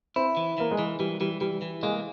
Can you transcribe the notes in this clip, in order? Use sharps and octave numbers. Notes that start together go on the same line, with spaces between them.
C4 E4
E3
E3 A#3
G#3
E3
E3 G3
E3 G3
E3 G3
E3
G#3 A#3